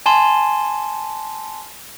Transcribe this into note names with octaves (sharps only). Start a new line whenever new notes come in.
G#5 A5 C6